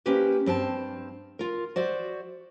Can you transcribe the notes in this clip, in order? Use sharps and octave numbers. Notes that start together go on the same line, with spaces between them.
A#3 C#4 E4 G4 B4 C5
G2 C4 G#4 A5
F4 A#4
F#4 C5 D5 E5